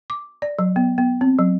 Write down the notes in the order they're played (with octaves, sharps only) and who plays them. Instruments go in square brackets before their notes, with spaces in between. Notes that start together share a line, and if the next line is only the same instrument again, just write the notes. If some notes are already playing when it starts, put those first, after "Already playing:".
[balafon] D6
D5
F#3
B3
B3
C4
F#3